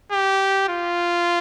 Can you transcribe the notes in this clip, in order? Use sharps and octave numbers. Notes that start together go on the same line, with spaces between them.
G4
F4